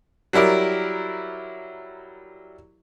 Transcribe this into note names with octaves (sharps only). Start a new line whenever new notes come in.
F#3 G3 E4 A#4 D5